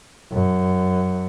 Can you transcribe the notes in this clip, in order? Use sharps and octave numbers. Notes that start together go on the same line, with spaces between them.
F#2